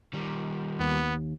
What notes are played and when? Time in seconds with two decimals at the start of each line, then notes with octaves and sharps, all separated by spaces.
0.13 D#3 G3
0.79 D#2 B3